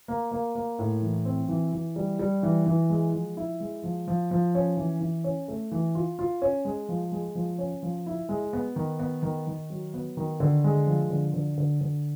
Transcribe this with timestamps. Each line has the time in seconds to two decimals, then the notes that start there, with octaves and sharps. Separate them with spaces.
0.08 A#3
0.31 A#3
0.55 A#3
0.79 A2
1.02 E3
1.25 C4
1.49 E3
1.73 E3
1.96 G3
2.19 G3
2.43 E3
2.67 E3
2.90 G#3
3.13 F3
3.37 E4
3.60 G#3
3.84 F3
4.08 F3
4.31 F3
4.55 C#4
4.77 E3
5.01 E3
5.24 C#4
5.48 A3
5.72 E3
5.95 F4
6.19 F4
6.42 C#4
6.65 G#3
6.89 F3
7.12 G#3
7.35 F3
7.58 C#4
7.83 F3
8.06 E4
8.29 G#3
8.53 B3
8.76 D#3
8.99 B3
9.22 D#3
9.47 D#3
9.70 F#3
9.94 B3
10.17 D#3
10.40 D3
10.64 G#3
10.87 F3
11.10 D3
11.34 D3
11.58 D3
11.81 D3